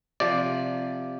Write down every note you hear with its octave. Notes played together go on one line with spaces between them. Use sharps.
C3 F3 D5